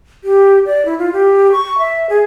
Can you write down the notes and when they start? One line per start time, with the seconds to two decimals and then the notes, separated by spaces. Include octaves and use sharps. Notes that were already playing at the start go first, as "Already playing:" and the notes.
0.24 G4
0.66 D5
0.85 E4
0.99 F4
1.13 G4
1.52 C#6
1.78 E5
2.10 G#4